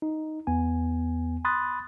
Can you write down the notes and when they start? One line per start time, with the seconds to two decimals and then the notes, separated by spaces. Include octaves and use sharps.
0.02 D#4
0.47 E2 B3 G#5
1.45 B5 C6 D#6 F#6 A6